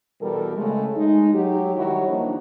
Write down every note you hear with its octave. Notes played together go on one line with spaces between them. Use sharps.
B2 E3 G3 A4 A#4
C#3 G#3 A3
G#3 D#4
F#3 G4
D#3 G3 E4 F#4 C#5
F3 A#3 D4 D#4